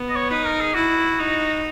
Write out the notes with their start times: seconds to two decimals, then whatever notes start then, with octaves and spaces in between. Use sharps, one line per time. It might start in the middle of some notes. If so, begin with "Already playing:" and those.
Already playing: B3
0.09 D#5
0.15 C#5
0.30 D#4 B4
0.45 A#4
0.61 G#4
0.75 E4 F#4
1.19 D#4